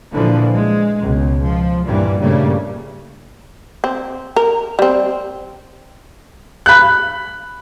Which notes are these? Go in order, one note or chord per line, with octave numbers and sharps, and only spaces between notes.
A#2 D3 E3 F3
G#3
C#2 B2
F3
G2 A#2 E3 G3
G2 A#2 C#3 G3 A3 A#3
C4
A#4
G3 C4
B5 F#6